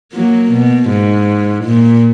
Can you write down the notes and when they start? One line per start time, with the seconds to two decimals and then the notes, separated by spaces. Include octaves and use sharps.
0.14 F#3 A#3
0.51 B2
0.90 G#2
1.65 A#2